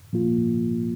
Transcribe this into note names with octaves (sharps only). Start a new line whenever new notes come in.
A#2 F3 A#3 F4